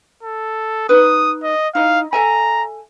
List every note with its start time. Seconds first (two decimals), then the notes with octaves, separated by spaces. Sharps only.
0.23 A4
0.89 D#4 B4 D#6
1.43 D#5
1.75 D#4 E4 D#5 F5
2.13 A4 E5 G#5 A#5